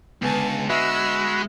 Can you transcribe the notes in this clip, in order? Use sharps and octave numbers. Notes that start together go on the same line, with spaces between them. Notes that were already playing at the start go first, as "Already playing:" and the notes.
C#2 D3 G#3 B3 G#5 A5
G#3 F#4 E5 B5 E6